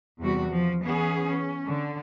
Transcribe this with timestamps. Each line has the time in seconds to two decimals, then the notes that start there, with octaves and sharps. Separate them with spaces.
0.20 E2 C3 G3 F#4
0.50 F3
0.82 E3 B3 C#4 G#4
1.28 C#4
1.68 D3